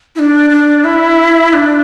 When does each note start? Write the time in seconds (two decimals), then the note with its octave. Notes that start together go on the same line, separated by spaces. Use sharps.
0.16 E4
0.19 D4
0.50 D4
0.84 E4
1.53 D4